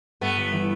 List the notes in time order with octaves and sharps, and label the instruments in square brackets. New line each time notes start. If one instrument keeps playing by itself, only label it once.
[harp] G2 [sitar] A3 B3
[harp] G1
E3